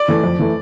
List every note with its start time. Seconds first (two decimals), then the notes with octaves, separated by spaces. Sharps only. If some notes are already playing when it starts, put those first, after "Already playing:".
Already playing: D5
0.08 E3 A3
0.24 F2
0.39 E3 A3